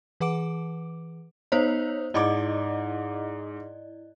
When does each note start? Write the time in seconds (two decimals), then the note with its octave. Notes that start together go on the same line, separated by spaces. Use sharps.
0.20 E3 G#4 B4 F#5 D6 D7
1.52 B3 D#4 C5 C#5
2.14 G#2 E4 D5 D#5 D6